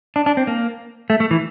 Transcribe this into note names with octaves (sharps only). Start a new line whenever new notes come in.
D4
D4
C4
A#3
A3
A3
E3